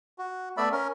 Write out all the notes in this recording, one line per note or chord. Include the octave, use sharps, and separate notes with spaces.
F#4
A3 B3 D5 E5 B5
C#4 A#4